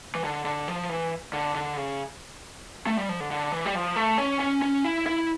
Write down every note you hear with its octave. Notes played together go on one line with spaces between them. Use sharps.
E3
D3
D3
F3
E3
D3
D3
C#3
A3
G3
F3
D3
D3
E3
G3
F3
A3
C#4
C#4
C#4
E4
E4